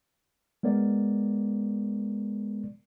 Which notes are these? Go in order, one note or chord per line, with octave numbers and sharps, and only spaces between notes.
G#3 B3 A#4 D5